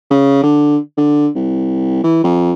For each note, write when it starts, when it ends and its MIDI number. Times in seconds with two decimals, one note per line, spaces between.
0.10 0.42 49
0.43 0.77 50
0.97 1.28 50
1.35 2.01 36
2.03 2.20 52
2.24 2.53 41